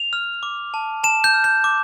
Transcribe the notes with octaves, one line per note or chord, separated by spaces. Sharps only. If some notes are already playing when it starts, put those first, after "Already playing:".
Already playing: F7
F6
D6
A5
A5 E7
G6
F6
G6
D6